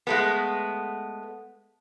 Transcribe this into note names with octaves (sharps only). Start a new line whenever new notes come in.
G#3 A3 B3